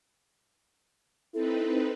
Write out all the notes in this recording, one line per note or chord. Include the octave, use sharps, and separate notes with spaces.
C4 D#4 E4 A4 B4